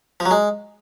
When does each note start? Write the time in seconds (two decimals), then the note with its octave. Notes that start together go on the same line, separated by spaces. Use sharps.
0.20 F3
0.26 F#3
0.31 G#3